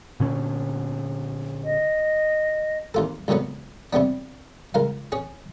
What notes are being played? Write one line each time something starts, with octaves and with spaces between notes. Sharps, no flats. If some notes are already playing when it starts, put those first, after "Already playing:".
A#2 D3 C#4
D#5
D#2 F4 A4
C#2 F#2 D3 F#3 B3
C3 G3 B3 D4
C#2 A#4 F5
C#4 G#4